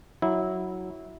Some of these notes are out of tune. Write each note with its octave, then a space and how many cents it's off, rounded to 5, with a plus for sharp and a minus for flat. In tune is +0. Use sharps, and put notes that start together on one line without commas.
F#3 +0 E4 -20